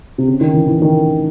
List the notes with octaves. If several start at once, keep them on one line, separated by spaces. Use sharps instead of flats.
C3
C#3
D#3
E3
E3
D#3